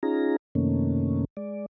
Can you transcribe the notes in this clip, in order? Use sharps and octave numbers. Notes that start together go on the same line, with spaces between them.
C#4 D#4 F4 G#4 A#5
F#2 C3 D#3 A3 A#3 C#4
G#3 D5